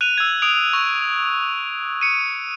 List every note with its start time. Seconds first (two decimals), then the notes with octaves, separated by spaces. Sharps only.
0.01 F#6 D#7 F7
0.18 E6 G#6
0.42 D#6 D7 F7
0.73 C#6
2.01 C#7 D#7